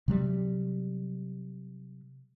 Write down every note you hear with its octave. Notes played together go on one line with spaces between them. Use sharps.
C3 F#3 G3